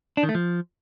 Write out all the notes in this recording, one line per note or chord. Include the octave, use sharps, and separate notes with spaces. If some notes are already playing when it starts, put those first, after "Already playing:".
D4
D#3
A3
F3